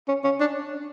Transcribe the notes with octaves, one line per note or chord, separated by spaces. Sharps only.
C#4
C#4
D4